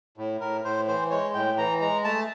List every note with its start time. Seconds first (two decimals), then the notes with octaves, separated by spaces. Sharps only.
0.17 A2
0.41 A2 A#4
0.64 A2 C5
0.88 E3 C5
1.11 G#3 C#5
1.34 A2 G5
1.57 E3 A#5
1.81 G#3 A#5
2.04 A3 A5